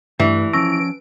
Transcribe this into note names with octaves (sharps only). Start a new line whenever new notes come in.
G2 E3 A3
F3 C#4 A5 C#6 E6 A#6 D7